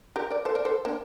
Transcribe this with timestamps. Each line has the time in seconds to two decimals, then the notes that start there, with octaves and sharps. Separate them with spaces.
0.16 G4 A#4
0.30 A#4 D5
0.45 A4 C5
0.55 A#4 D5
0.65 A4 C5
0.85 A#3 D4